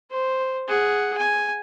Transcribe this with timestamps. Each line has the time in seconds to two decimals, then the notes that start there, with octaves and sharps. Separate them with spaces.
0.11 C5
0.67 G#4 F#5
1.17 G#5